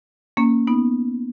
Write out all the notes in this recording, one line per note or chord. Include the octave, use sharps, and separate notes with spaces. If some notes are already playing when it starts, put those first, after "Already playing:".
A#3 C#4
B3 D#4